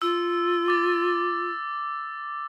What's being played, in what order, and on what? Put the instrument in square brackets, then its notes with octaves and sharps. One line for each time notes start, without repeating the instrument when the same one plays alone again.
[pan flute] F4 [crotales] E6
[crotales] D6 A6